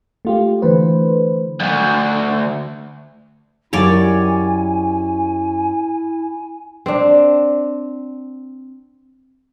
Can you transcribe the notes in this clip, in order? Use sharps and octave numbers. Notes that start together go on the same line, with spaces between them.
A3 F4 G4
D3 E3 A3 B4 C5
D2 G2
F#2 E4 G4 A#4 C#5 D5 G#5
C4 D4